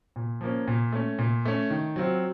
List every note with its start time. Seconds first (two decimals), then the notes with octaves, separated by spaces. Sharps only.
0.16 A#2
0.41 F3 A#3 C#4
0.68 A#2
0.92 A3 C#4
1.19 A#2
1.45 A3 C#4
1.70 D#3
1.96 F#3 C4 F4